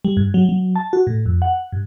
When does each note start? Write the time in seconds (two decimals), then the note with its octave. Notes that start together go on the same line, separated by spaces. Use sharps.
0.05 G3
0.17 G2
0.34 F#3
0.49 F#3
0.76 A5
0.93 F#4
1.07 A2
1.26 F2
1.42 F#5
1.72 G2